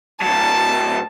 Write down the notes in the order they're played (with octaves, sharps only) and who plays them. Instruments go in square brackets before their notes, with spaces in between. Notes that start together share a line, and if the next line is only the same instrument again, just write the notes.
[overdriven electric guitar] A2 F#3 [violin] A5